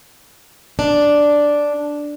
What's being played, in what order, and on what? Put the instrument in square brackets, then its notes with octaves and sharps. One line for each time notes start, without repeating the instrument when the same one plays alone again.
[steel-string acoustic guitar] D4